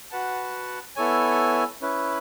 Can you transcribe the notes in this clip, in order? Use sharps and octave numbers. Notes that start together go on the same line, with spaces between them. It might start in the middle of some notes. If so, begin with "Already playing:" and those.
F#4 B4 F#5 A5
B3 E4 A4 C#5 G#5
C#4 E4 B4